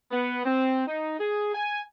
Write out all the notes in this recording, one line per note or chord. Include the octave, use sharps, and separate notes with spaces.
B3
C4
D#4
G#4
G#5